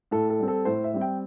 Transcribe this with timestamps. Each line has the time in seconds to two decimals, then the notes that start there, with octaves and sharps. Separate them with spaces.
0.11 A2 A4
0.30 A4
0.39 G3 C4
0.48 A4
0.65 A2 C5
0.84 E5
0.94 G3 C4
1.01 G5